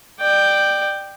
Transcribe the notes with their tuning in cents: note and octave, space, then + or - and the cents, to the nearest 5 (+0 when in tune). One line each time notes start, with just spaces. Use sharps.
D5 +25 G5 +0